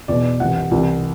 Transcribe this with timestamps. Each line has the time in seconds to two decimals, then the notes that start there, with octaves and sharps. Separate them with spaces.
0.08 E2 B2 D5
0.40 C2 C3 E3 F#5
0.56 F#5
0.71 C2 C3 E3